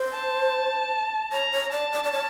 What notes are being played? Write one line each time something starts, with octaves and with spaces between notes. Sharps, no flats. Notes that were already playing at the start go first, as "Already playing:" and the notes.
Already playing: C5
A5
C#5 A#5
C#5
D5 A5
D5
D5
C#5